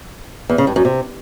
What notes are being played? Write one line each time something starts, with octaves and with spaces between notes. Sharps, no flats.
E2
C#3
G2
F#2
C3